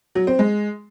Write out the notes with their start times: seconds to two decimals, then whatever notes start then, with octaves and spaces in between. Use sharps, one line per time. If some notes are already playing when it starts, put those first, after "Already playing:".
0.15 F#3
0.27 C4
0.39 G#3